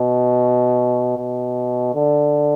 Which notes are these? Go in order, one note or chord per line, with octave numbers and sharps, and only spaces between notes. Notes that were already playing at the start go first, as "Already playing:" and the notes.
Already playing: B2
B2
D3